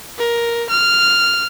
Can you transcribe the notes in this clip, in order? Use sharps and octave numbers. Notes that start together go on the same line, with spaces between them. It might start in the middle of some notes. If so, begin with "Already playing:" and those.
A#4
F6